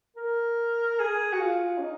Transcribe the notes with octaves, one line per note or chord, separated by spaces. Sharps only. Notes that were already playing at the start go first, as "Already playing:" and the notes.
A#4
G#4
F#4
F4
C#4
D#4